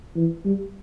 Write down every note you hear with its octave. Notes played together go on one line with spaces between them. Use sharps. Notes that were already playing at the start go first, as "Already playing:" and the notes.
E3
G3